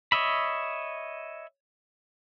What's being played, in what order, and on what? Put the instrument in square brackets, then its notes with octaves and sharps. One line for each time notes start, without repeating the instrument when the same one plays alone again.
[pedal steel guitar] C#5 D#5 E5 B5